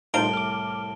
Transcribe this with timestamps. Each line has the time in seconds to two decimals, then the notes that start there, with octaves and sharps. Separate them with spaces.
0.14 C2 A2 D#4 F4 C5 A5 D7 G7
0.33 D6 F6